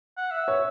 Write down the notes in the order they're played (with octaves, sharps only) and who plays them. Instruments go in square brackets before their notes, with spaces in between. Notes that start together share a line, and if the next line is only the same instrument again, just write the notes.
[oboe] F#5
E5
[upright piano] C#5